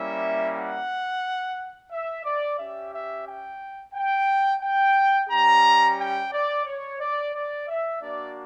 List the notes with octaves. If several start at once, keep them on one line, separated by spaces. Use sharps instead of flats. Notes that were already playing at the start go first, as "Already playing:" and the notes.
Already playing: G3 A#3 C#4 E4 E5
F#5
E5
D5
C#4 G4 E5
E5
G5
G5
G5
G3 C#4 G4 A#5
G5
D5
C#5
D5
D5
E5
A#3 D4 F#4 D5